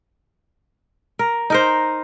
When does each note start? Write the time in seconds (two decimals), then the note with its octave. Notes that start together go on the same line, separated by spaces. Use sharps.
1.19 A#4
1.50 D#4 A#4 C5